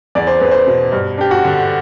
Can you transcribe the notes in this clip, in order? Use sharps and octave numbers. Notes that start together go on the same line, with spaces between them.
E2 D5
C5
E2 B4
C5
B2
G2
D4 G4
F#4
D3